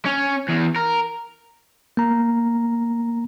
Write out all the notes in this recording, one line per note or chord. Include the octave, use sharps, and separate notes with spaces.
C#4
E2
A#4
A#3 A#5